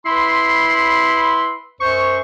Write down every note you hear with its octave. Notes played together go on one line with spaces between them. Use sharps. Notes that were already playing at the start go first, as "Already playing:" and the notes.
E4 B4 B5 C6
F#2 C5 C#6